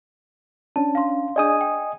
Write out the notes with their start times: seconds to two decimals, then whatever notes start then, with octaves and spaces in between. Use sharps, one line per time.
0.76 C#4 D4 A5
0.95 F5 C6
1.36 D4 G#4 D5 D#5 G#5 D#6
1.61 G5